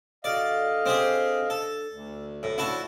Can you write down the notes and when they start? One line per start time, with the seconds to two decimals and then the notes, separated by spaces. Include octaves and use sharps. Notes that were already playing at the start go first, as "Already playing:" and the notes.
0.24 D3 F#4 D5 D#5 F5
0.86 C4 G4 G#4
1.50 A4
1.92 D2
2.43 E2 A2
2.58 F3 D4 E4 F#4 A4